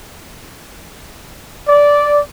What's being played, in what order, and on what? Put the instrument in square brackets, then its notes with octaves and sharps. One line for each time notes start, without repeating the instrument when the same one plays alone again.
[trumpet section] D5